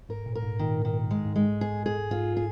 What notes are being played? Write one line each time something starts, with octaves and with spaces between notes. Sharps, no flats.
G#2 A#4
A#2
A#4
G#2
A#2 D#3
G#2
D#3
A#2
G#2
G#3
G#2
G#3
G#4
G#4
G#2 F4
G#4